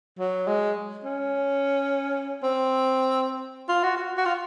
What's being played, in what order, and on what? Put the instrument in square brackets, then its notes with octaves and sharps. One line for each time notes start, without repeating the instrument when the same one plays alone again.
[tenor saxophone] F#3
G#3
C#4
C4
F4
F#4
F#4
F#4
F4